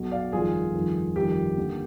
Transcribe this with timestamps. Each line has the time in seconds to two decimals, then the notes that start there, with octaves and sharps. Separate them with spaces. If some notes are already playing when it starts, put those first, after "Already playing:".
Already playing: B1 B2
0.11 D5 F5
0.33 G1 F2 D#3 F4 G#4
0.74 G1 F2 D#3
1.16 G1 F2 D#3 G4
1.58 D#2 D3